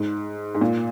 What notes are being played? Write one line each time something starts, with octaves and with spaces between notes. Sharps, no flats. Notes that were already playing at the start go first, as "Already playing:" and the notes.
Already playing: G#2
G#2
A#2